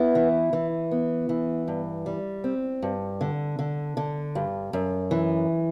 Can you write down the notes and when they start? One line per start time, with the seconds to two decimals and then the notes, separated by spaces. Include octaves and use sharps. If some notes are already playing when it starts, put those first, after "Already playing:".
Already playing: B3 E4
0.15 E3
0.53 E3
0.91 B3
1.29 E3
1.68 G2
2.06 G3
2.44 C4
2.82 G2
3.21 D3
3.59 D3
3.97 D3
4.35 G2
4.73 F#2
5.11 E3